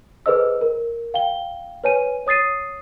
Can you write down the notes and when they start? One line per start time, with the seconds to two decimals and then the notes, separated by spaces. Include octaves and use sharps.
0.26 G#4 A4 B4 C5 D#5 E6
0.61 A#4
1.14 F5 G5 G7
1.84 B4 C#5 G#5 D#7
2.27 C#5 D#6 A6 C7 D#7